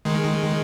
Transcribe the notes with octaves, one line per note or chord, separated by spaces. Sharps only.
D#3 G#3